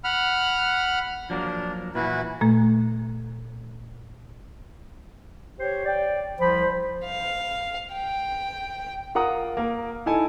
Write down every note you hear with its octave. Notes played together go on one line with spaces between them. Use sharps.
F#5 B5 F6
F3 F#3 A#3 D4
A#2 E3 E4 F#4 B4
A#2 A3
G4 C5 C#5
D5 G5
C2 F3 C5 B5
F5
G5
F4 A#4 F#5 A#5 D#6
A#3 A#4
D#4 E4 A4 G#5